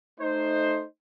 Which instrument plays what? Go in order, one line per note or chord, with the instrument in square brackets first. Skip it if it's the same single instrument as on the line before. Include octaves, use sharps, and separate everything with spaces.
[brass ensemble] A3 D#4 C5